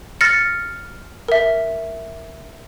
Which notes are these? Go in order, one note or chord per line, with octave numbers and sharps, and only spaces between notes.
F6 A6 A#6 C#7
A#4 E5